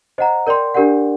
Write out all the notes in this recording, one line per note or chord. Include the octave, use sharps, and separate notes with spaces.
C5 D#5 F#5 A#5
A#4 D5 G5 C6
D4 G4 A#4 D5 F#5